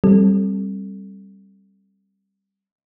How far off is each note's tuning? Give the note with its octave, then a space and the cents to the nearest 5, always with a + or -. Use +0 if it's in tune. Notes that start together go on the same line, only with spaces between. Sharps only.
G3 +0 C4 +20 A4 +0